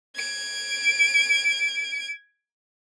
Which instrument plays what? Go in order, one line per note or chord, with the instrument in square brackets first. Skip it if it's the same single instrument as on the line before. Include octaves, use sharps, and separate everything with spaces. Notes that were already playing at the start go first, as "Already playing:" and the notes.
[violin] G#6 D7